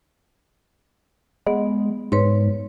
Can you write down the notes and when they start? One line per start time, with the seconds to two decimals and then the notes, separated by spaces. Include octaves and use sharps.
1.46 G#3 B3 F#5
2.12 G#2 B4 C#5 C6